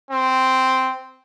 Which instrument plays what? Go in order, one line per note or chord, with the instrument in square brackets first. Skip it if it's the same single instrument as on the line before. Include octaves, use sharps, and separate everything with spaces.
[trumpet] C4